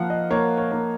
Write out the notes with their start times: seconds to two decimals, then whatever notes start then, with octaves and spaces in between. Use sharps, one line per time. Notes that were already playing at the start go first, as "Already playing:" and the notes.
Already playing: F3 A#3 F5 F#5
0.10 D#5
0.31 A#3 C#5
0.58 C#5
0.72 A#3